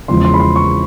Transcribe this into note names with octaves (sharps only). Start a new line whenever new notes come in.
E2 C#3 F3 G#3 C6
C6
B5
C6
C#6